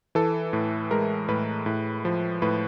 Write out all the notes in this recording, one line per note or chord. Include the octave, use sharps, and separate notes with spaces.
E3 A4
A2
G#3 A#4
A2 B4
A2
F3
A2 B4